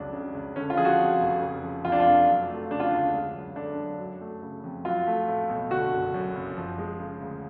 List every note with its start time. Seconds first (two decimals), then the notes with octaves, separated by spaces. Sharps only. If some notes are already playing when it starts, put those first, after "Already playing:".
Already playing: F1 C#2 F#3 D4
0.13 C#3
0.35 C#2
0.56 D3 C#4
0.70 F4
0.77 F3 G#4
0.85 F#4
0.99 F2
1.20 F1
1.42 C#3
1.63 F3
1.85 F2 F4
1.92 D4
2.00 F4
2.06 F1
2.27 F#3
2.48 A3
2.71 C#3 D4
2.80 F4
2.89 D2 D4
3.13 G#3
3.35 F#2
3.56 D3 D4
3.78 F#2
3.99 F#3
4.21 A3
4.42 C#3
4.64 F2
4.85 F#3 F4
5.07 A3
5.28 A2
5.49 B1
5.71 D3 F#4
5.93 F#1
6.14 F#2
6.35 F#1
6.57 F3
6.78 G#3
6.99 C#3
7.21 D2